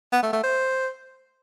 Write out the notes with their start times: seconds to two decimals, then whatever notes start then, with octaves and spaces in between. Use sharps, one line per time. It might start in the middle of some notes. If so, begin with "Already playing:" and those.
0.13 B3
0.23 A3
0.33 A3
0.44 C5